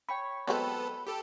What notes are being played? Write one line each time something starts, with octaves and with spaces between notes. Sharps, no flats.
C#5 G5 B5 C#6
F#3 G#3 B3 C4 A4 B4
G4 A4